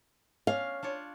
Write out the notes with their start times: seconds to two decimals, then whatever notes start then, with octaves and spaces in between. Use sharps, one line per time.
0.47 C#4 D4 F5
0.83 D4 F4 C#5